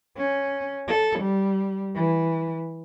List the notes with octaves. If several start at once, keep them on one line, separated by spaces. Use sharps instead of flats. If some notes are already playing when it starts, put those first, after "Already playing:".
C#4
A4
G3
E3